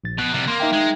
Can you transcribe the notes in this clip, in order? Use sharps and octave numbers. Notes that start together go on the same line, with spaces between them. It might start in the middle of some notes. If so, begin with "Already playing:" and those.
A#1 A6
B2 F#6
C3 G3
A#3 C6
D#4 E5 G5
G#3